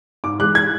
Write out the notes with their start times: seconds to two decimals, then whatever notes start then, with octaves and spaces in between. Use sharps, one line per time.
0.24 G#2 D6
0.39 E3 G#3 F#6
0.55 G#6